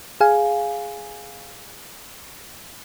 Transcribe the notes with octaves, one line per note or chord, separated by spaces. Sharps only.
G#4 F5 G#5